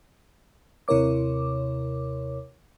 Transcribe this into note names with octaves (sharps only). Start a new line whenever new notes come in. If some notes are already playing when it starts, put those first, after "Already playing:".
D#2 C3 E4 A#4 C#5 D6